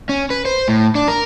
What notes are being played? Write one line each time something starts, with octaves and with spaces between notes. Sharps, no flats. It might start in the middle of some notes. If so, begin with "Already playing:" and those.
C#4
B4
C5
A2
D4
A#4